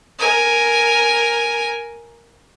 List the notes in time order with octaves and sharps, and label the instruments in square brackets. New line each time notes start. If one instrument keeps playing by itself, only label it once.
[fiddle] A#4 G#5